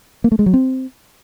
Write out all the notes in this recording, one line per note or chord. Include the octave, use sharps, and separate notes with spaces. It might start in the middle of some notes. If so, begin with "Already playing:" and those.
A#3
A3
G#3
F#3
C4